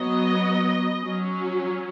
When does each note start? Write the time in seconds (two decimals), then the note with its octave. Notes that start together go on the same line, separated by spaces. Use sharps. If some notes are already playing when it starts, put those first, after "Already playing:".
Already playing: F#3 B3 D#5
1.04 F#3 C#4